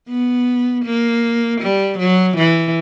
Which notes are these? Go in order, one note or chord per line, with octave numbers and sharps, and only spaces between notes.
B3
A#3
G3
F#3
E3